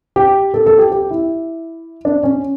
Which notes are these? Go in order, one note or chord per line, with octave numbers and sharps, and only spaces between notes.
G4
A4
A4
G4
G4
E4
D4
C#4